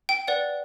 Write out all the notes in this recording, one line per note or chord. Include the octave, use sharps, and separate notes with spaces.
G5
B4 D5 F#5